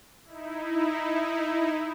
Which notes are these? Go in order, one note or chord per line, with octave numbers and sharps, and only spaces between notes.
D#4 E4